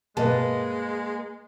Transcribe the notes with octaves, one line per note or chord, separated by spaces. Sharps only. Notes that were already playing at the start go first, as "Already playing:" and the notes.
G2 B2 G3 G#3 A#3 B4 D#5 A5